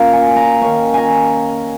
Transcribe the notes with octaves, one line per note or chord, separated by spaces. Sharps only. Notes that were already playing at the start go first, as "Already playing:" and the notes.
Already playing: A#2 A#3 C#4 F5 A#5
G#5
A#5
D#3 C#4 C#6
G#5 A#5